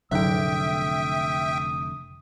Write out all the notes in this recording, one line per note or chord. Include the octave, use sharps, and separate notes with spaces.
F1 F2 A2 D3 F#3 E5 G5 D#6